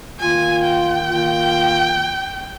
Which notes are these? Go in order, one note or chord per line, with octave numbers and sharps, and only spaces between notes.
D#3 A#3 F4 G#5
G5
D#3 A#3 F4